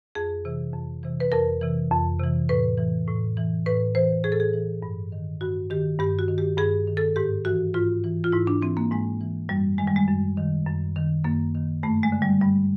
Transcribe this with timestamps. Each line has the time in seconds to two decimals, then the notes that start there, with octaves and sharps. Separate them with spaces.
0.15 F2 G#4
0.45 C3 E3
0.74 F2
1.03 C3 E3
1.20 B4
1.32 F2 A#4
1.61 C3 E3
1.91 F2
2.20 C3 E3
2.49 A2 B4
2.78 E3
3.08 A2
3.37 E3
3.66 A2 B4
3.95 E3 C5
4.24 A2 G#4
4.32 A4
4.40 G#4
4.53 E3
4.82 G2
5.12 D#3
5.41 G2 F#4
5.70 D#3 G4
5.99 G2 G4
6.19 F#4
6.28 D#3
6.38 G4
6.57 G2 G#4
6.87 D#3
6.97 A4
7.16 G#2 G4
7.45 E3 F#4
7.74 G#2 F4
8.04 E3
8.24 F4
8.32 G#2 E4
8.47 D4
8.62 E3 C4
8.77 A#3
8.91 G#2 G#3
9.21 E3
9.49 F#2 G3
9.78 D#3 G#3
9.87 G3
9.96 G#3
10.08 F#2
10.37 D#3
10.66 F#2
10.96 D#3
11.24 F#2 A#3
11.54 D#3
11.83 G2 A3
12.03 G#3
12.12 D3
12.22 G3
12.42 G2 G3